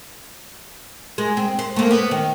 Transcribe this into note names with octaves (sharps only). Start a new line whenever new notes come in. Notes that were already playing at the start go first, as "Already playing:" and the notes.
G#3
C4
C5
A3 A#3
B3
D#3